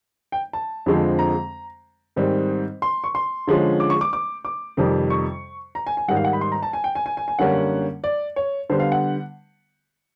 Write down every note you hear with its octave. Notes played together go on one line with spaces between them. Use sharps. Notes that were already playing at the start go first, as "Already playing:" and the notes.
G5
A5
F2 D3 F3 G#3 C4
A#5
G#2 D#3 G3 C4
C6
C#6
C6
D3 F3 G#3 C#4
D6
C#6
D6
D6
D6
F2 C3 D#3 G3
C#6
A#5
G#5
G#5
G#2 D#3 G3 F#5
F5
F#5
B5
C6
A#5
A5
G#5
G5
G#5
G#5
G#5
G#5
F#2 D3 G3 A#3 C#4 F#5
D5
C#5
D3 G3 B3 C5
F5
F#5